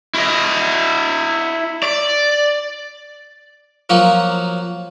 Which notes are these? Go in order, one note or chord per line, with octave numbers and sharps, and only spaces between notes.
E4 D#5
D5
F3 F#3 A#3 F#4